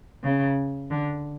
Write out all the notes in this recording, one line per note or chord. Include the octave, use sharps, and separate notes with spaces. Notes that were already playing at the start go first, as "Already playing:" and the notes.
C#3
D3